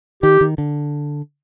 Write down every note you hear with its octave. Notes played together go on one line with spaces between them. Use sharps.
D#3 G4
D#3
D3